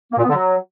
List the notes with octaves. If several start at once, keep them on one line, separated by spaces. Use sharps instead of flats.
A#3
A#2
B3
D3
F#3